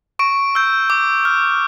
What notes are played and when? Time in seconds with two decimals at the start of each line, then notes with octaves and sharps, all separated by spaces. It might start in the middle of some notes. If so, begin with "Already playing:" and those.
0.19 C#6 D7
0.55 E6 G6
0.90 D6
1.25 F6